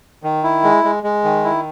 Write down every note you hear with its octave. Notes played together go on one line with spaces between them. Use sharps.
D#3
E4
G#3
G#3
G#3
D#3
E4